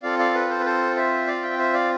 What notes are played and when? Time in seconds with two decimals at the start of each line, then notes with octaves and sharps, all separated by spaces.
0.03 C4 F4 A4 D5 F5
0.19 D5 F5
0.34 B4
0.49 A4 C5
0.60 B4
0.65 A4 C5
0.96 C5 E5
1.27 D5 F5
1.43 E5 G5
1.58 C5 E5
1.73 D5 F5